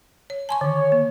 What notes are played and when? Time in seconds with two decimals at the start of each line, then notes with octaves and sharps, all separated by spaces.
0.30 C#5
0.49 G#5 A5 C6 C#6
0.61 D3 D#3 C#5
0.92 A#3